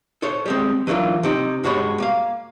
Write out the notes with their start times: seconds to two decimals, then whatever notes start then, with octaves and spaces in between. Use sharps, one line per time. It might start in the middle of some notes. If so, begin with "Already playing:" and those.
0.22 A4 C5 C#5
0.46 G3 G#3 C4
0.87 E3 F#3 A#3 D4 F4
1.23 C3 C4 D#4
1.64 G2 G#3 F#4 C#5 B5
2.00 A#3 F5